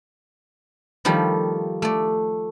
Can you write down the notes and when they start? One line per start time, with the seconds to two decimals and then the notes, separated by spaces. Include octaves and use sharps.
1.05 D#3 F3 G3 A3
1.82 A3 D5